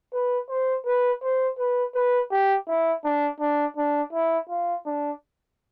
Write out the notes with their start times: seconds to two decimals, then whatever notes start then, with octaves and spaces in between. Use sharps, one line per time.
0.13 B4
0.50 C5
0.86 B4
1.22 C5
1.59 B4
1.95 B4
2.31 G4
2.68 E4
3.04 D4
3.41 D4
3.77 D4
4.13 E4
4.49 F4
4.86 D4